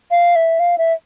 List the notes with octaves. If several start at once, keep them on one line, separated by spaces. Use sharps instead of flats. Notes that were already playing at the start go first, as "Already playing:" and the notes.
F5
E5
F5
E5